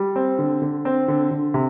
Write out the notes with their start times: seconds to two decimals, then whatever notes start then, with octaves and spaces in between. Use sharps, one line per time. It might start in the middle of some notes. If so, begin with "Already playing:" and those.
Already playing: G3
0.16 C4
0.39 D3
0.62 D3
0.85 C4
1.08 D3
1.31 D3
1.54 C3